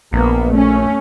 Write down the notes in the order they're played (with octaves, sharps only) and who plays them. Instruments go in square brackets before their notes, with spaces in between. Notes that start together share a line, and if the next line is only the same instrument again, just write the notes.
[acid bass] A#1 [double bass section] A#3 B3
[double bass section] A3 C#4